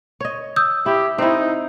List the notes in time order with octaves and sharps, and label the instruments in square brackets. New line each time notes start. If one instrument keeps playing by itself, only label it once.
[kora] C#5 D#5
[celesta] D#6 E6 G6
[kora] E4 [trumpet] G4
[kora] C4 E4 [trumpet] D#4